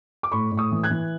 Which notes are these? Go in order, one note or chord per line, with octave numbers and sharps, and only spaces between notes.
D6
A2 B5 C#6
A2
C#6 D#6
E3
F#6 G#6
E3